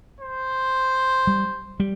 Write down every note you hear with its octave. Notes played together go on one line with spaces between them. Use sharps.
C5
G3
G3